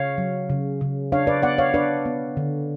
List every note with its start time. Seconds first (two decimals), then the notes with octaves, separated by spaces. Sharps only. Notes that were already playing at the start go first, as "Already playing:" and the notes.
Already playing: C#3 C#5 F5
0.18 F#3
0.50 C#3
0.81 C#3
1.12 D4 C#5 F5
1.27 B4 D5
1.42 B3 D5 F#5
1.58 C#5 F5
1.74 D4 B4 D5
2.06 B3
2.37 D3